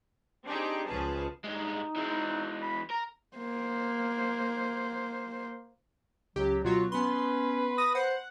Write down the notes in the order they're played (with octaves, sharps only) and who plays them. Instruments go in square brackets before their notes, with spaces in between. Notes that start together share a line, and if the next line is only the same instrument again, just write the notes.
[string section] C4 D4 D#4 G4 G#4
C#2 F3 C#4 G#4 B4 A5
[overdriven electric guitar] G2 G#3 [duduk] D#4
[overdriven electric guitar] E3 G#3 [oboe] C4
[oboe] B5
[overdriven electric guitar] A#4 [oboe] A#5
[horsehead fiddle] A#3 C5
[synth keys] C#2 G4 [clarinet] F#3
[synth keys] B2 F#3 C#5 [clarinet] F4
[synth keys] B3 C6 [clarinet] C#4 [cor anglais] B4
[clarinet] D#6 [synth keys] A#6
[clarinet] C5 [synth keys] F#5